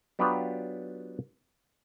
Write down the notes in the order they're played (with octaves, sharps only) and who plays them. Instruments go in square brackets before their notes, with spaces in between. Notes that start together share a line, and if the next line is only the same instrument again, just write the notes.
[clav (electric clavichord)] F#3 B3 D4 F4 G4 B4